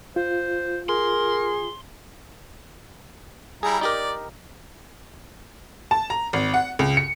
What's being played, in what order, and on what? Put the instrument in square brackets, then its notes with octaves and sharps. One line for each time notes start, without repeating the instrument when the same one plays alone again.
[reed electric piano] F4 [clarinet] C5
[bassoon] G#4 [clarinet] A#4 [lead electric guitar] C6
[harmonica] G3 E4 A#5 [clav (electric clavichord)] G#4
[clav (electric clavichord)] D#4 G4 A#4 [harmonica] D5
[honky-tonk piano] A5
A#5
G#1
F#5
C#2
C#7